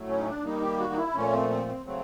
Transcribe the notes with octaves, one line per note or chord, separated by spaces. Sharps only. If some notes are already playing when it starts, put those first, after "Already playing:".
Already playing: A2 F#3 A3
C#4
D#4
D4
D#3 G3 A#3 D#4
G4
F#4
D#4
E4
A#2 F3 A3 C#4
C4
C4
C4
C#3 F#3 A3 C4